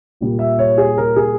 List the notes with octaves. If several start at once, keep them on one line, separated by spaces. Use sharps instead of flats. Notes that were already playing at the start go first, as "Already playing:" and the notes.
A#2 G3 A#3
E5
C#5
G#4
A#4
G#4